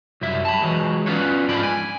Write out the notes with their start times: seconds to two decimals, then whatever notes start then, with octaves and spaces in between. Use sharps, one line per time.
0.21 C2 F#2 E4 E5
0.45 A5 B5
0.62 E3 F#3 G#3
1.06 B3 C#4 D4 F4 B4 C#5
1.48 G#2 D3 F3 D5 B5
1.63 G#5